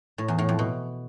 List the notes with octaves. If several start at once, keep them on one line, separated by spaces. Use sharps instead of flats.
A2
E2
A2
F2
B2